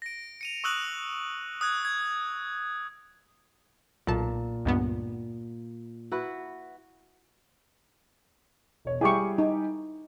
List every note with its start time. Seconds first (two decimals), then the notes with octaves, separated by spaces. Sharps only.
0.02 A#6 D7
0.41 C#7 D#7 F7
0.64 C#6 D#6 E6 F#6 F#7
1.61 D#6 F#6 G#6
1.85 G#6
4.07 B1 A#2 A5
4.65 C#2 G2 B3
6.12 E4 F#4 B4
8.85 E1 C#5
9.01 G3 E4 G4 G#4 C#6
9.38 D#4